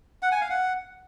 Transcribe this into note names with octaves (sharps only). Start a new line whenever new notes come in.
F#5
G#5
F5
F#5